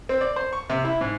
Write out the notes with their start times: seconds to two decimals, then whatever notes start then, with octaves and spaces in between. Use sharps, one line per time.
0.09 C4
0.21 D5
0.36 C5
0.53 C#6
0.70 C3
0.85 E4
1.01 G#2